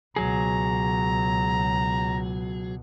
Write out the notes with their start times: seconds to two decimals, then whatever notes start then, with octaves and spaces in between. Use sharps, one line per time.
0.16 C#2 B2 F#3 G#4 A#5